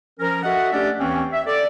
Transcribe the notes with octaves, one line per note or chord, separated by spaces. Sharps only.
F3 C#4 A#4
F#4 A4 D#5 E5 F#5
A3 C#4 D4 G4 D5 E5
D#2 E3 A#3 C4 C#4
E5
A4 D5